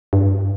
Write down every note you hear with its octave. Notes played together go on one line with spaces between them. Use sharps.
G2